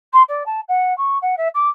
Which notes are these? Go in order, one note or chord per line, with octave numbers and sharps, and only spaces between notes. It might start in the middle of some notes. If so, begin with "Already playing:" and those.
C6
D5
A5
F#5
C#6
F#5
E5
D6